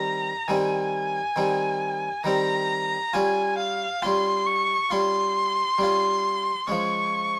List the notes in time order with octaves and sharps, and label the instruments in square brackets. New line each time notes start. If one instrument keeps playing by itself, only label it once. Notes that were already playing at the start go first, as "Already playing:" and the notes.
Already playing: [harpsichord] D#3 G3 C4 [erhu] A#5
[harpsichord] D#3 G3 C4 [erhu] G#5
[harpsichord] D#3 G3 C4
[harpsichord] D#3 G3 C4 [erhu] A#5
[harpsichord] G3 C#4 F4 [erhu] G#5
[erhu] F5
[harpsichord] G3 C#4 F4 [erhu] C6
[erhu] C#6
[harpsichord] G3 C#4 F4 [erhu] C6
[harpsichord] G3 C#4 F4
[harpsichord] F3 G#3 C#4 [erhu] C#6